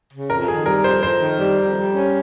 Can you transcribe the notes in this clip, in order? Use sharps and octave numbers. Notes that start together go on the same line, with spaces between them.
C#3
F2 A#4
D#3 G#4
G3 A#4
F2 C5
F2 C5
D#3
G3
F2
G3
C#4